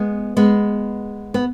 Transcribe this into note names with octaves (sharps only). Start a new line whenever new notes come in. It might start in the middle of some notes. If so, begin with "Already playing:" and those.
Already playing: G#3 B3
G#3 B3
B3